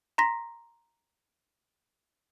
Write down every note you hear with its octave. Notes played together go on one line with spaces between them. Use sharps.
A#5 C6 A#6 B6